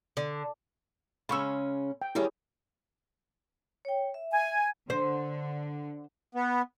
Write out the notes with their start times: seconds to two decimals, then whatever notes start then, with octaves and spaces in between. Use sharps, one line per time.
0.17 D3
1.29 C#3 G#3 C#4 B5 C#6 E6
2.02 G5
2.15 D#3 G3 C#4 E4 G4 G#4
3.85 C#5 G5
4.14 E5
4.32 G#5
4.90 D3 C5
6.35 B3